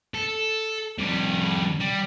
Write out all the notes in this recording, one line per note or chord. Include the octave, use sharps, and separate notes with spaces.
A4
F2 G3
G3